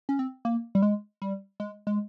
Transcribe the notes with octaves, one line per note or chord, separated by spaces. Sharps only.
C#4
C4
A#3
G3
G#3
G3
G#3
G#3